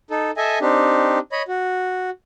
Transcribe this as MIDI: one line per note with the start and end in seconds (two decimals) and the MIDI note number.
0.11 0.31 63
0.11 0.31 69
0.37 0.59 69
0.37 0.59 75
0.37 0.59 76
0.37 0.59 80
0.61 1.19 60
0.61 1.19 62
0.61 1.19 63
0.61 1.19 67
1.32 1.42 73
1.32 1.42 75
1.32 1.42 83
1.48 2.10 66